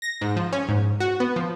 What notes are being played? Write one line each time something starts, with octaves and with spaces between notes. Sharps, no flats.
A#6
G#2
F3
C#4
G#2
F#4
B3
F3